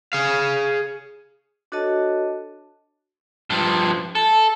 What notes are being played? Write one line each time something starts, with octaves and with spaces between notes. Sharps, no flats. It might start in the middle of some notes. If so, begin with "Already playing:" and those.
G#4 F5
D4 F#4 A4 C#5 D#5 A5
G2 F3
A4